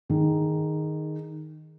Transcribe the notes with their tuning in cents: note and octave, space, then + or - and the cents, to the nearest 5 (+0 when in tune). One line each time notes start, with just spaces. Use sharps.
D#3 -5 G#4 +0